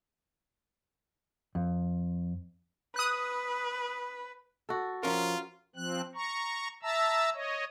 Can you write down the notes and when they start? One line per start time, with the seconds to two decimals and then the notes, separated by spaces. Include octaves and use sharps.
1.55 F2
2.96 B4 D#6 F#6
4.69 F#4 A4
5.03 F3 C#4 F4 A#4
5.76 F3 C4 F#6
6.15 A#5 C#6
6.82 E5 A5 A#5 E6
7.34 C#5 D#5